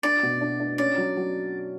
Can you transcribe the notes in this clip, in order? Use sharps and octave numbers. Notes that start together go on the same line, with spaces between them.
D4 D5
B2
D4
D4
C#4 D5
F#3
F#3